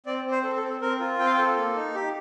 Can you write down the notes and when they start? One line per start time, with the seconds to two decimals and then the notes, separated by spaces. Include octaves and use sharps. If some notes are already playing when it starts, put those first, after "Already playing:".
0.06 C4 D5
0.25 C4
0.32 C5
0.43 A4
0.56 A4
0.63 C4
0.81 C4 A#4
1.00 F4
1.19 C4 G5
1.26 F5
1.33 G5
1.38 A4
1.57 A#3
1.75 D#4
1.95 G4